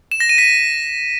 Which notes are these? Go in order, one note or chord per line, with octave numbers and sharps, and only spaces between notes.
E7
A#6
D#7
B6